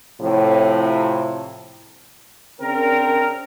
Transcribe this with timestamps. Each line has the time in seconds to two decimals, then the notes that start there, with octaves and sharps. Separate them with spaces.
0.21 A2 C3 F3
2.61 C#3 C4 D4 A#4